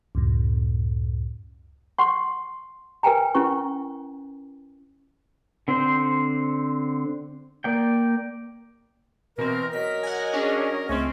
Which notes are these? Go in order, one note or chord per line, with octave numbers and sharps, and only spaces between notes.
C#2 F#2 A2
F#5 C6 C#6
A#4 B4 G5 G#5 A#5
C#4 E4 B4 C#6
D3 C4 C5
A#3 D5 G5
B2 E3 C4 A#4
F#3 A#4 D#5 B6
F#5 G#5
C#4 D4 G#4
C#2 G#3 A3 C4 C#4